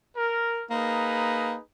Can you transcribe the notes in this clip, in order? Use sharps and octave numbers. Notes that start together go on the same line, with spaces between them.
A#4
A#3 D#4 G#4 B4